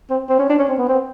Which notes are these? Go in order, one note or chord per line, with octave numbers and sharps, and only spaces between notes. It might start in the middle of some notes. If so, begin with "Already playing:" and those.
C4
C4
C#4
D4
C#4
C4
B3
C4